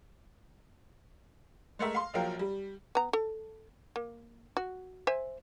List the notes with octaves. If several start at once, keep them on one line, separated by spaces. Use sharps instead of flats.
G#3 A3 A#4 E5
F5 C6
A#1 F3 F#3 A#4 F5 G5
G3
B3 A#5
A4
A#3
F#4
C5 E5 G#5